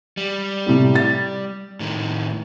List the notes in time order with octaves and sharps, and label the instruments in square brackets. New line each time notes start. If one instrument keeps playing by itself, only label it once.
[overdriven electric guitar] G3
[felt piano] A2 C3
A6
[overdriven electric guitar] A2 D#3